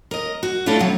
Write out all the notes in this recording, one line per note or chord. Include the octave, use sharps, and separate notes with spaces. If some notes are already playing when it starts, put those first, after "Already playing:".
A#4 D#5
F#4
A3 C#4 D4 E4 F4 A4
C3 F#3